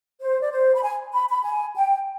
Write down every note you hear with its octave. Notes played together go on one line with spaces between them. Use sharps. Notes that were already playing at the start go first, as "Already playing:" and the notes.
C5
D5
C5
B5
G#5
B5
B5
G#5
G5